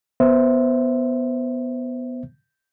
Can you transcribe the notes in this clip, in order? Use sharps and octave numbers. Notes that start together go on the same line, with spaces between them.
B3 C5 E5